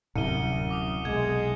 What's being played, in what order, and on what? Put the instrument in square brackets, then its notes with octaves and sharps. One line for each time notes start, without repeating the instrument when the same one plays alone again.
[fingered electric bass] D1 F#2 [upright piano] C2 [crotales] C#7 D#7 G7
[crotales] D6 D#6
[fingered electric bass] B1 [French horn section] G#3 [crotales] G#6